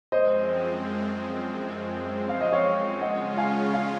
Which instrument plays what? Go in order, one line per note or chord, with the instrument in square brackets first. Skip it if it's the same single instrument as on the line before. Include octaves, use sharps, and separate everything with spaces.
[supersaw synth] F#2 F3 G#3 C4 [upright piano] C5 D#5
[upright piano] F5
D#5
C#5 F5
[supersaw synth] C#3 G#3 C#4 F4 [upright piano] D#5 F#5
[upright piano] F5 G#5
F5 G#5